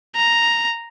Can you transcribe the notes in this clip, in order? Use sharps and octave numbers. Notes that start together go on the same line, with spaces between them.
A#5